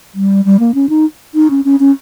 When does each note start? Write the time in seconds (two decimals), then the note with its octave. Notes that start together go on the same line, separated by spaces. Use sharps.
0.15 G3
0.45 G3
0.60 A#3
0.74 C#4
0.89 D#4
1.35 D#4
1.50 C#4
1.65 C#4
1.80 C#4